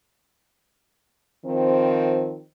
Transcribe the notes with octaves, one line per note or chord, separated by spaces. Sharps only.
D#3 F3 C4